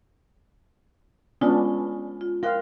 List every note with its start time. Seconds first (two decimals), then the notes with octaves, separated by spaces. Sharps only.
1.41 G#3 B3 C#4 D4 F4 D#6
2.21 F4
2.43 F4 A#4 F5 G5 F#6